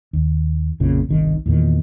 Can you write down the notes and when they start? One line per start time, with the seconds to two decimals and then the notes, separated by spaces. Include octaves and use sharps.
0.13 D#2
0.80 A#1 F2 A#2 C#3
1.09 G1 C2 D#3
1.46 E2 A#2 D#3